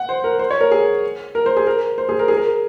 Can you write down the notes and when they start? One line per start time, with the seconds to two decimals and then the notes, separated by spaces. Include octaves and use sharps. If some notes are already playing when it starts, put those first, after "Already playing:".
Already playing: F#5
0.09 C5
0.24 A#4
0.39 C5
0.50 C#5
0.61 A#4
0.72 G#4
1.35 A#4
1.46 C5
1.57 G#4
1.67 A#4
1.98 C5
2.09 G#4
2.19 A#4
2.28 G#4
2.37 A#4